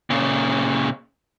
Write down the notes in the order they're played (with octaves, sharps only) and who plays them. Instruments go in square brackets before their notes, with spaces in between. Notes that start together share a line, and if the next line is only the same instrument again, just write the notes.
[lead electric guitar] A#2 C#3